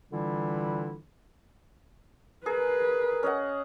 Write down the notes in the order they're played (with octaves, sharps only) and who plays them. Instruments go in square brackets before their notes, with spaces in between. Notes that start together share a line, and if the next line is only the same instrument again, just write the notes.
[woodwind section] D3 E3 G3 D4 E4 F4
[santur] G#4 [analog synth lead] A#4 [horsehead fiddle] B4
[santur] C#4 D#5 F#5